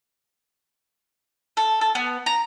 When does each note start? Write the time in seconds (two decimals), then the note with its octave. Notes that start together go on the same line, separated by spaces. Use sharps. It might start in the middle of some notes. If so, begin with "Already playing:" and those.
1.57 A4
1.81 A4
1.95 B3
2.26 A#5